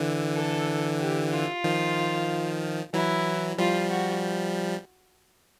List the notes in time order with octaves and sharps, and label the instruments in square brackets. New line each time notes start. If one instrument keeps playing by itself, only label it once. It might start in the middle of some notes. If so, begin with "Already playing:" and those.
Already playing: [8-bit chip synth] D3 E3
[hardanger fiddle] A4
G4
F4
[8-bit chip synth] D#3 F3
[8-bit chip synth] E3 F#3 [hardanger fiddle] E4
[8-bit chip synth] F3 G3 [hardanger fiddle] F4
[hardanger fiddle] F#4